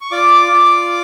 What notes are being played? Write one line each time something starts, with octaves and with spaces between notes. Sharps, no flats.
C#6
F4 D5 D6
F4